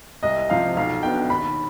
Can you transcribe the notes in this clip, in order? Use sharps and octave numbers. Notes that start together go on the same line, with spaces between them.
C2 D#5
C3 F3 C4 F5
B1 F5
B2 B3 D4 G5
D#2 B5